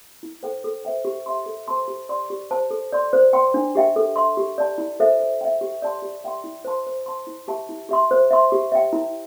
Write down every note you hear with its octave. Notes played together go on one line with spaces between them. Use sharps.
E4
A4 C5 G5
A4
C5 E5 G5
G4
E5 C6
A4
C5 A5 C6
G4
D5 C6
G4
C5 A5
A4
D5 C6
C5
G5 C6
D4
G4 E5 G5
A4
E5 C6
G4
D5 A5
E4
A4 C5 E5
C5
E5 G5
G4
D5 A5 C6
G4
E5 G5 C6
E4
C5 A5 C6
C5
A5 C6
E4
G4 E5 A5
E4
G4 E5 C6
C5
E5 C6
G4
E5 G5
E4